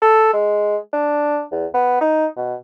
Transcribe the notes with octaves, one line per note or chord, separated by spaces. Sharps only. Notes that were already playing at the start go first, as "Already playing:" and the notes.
A4
G#3
D4
E2
B3
D#4
B2